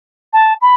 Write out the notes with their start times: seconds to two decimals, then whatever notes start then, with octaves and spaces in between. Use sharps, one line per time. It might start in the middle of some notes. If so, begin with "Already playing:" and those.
0.33 A5
0.61 B5